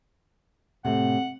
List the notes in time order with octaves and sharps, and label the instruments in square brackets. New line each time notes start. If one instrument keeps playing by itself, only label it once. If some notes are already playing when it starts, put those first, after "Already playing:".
[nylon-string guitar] A2 C3 [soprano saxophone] F#5